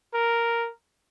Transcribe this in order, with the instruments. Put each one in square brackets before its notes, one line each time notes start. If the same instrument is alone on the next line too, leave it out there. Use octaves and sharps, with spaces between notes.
[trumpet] A#4